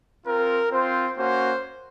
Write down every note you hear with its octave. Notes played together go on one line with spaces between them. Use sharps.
C4 F4 A#4
C4 F4 C5
A#3 C#4 F#4 C5